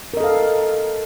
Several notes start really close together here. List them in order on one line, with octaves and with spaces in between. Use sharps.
A#4 D#5 A4 F5